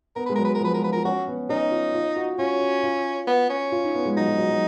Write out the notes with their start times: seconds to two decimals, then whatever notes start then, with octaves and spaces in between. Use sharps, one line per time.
0.16 B3 A#4
0.26 G#3 B4
0.35 F#3 A#4
0.45 B4
0.55 A#4
0.61 F3 B4
0.72 G#3 A#4
0.83 F4 B4
0.93 F4 A#4
1.05 C#4 F#4
1.28 B3
1.49 C#4 D#4
1.71 F4
1.94 F4
2.16 F#4
2.38 C#4 F4
2.61 F#4
2.83 F4
3.27 B3
3.49 C#4
3.72 F4
3.84 D#4
3.95 B3
4.05 G#3
4.17 F#3 D#4
4.28 F#3
4.39 F#3
4.50 F#3